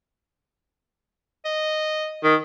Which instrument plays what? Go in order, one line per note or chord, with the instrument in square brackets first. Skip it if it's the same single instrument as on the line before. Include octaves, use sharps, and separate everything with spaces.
[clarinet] D#5
[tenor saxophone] D#3